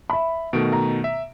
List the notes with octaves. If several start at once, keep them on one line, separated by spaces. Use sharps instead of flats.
E5 B5
B2 D#3 A3 D7
A#5
E5